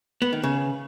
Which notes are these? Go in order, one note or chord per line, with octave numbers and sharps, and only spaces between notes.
B3
D#3
C#3